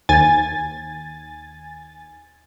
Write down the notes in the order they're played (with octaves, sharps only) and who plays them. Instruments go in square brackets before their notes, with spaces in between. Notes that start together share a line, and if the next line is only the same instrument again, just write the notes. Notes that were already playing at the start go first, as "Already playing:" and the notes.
[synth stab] D#2 G#5 A6